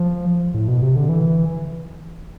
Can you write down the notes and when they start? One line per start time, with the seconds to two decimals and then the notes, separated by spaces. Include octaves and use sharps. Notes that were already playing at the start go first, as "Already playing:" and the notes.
Already playing: F3
0.54 A2
0.68 B2
0.82 C3
0.96 D3
1.09 E3